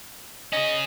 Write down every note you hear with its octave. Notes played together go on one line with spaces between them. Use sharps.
C#4 G#4 D#5